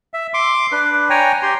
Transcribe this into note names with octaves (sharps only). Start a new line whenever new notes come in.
E5
C6 D6
D4 B4
C#5 G5 G#5 A#5
G4 C6